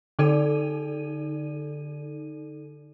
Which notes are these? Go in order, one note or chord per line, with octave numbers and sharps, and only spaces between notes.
D3 D#4 A4 D5 D#7